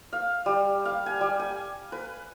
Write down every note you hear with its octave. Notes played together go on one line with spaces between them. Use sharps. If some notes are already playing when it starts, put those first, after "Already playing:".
F5
G3
F5
G#5
G3
G#5
B4